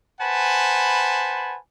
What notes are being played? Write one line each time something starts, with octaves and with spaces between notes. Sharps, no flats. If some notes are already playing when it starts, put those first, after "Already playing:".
B4 C5 F#5 G#5 A5 B5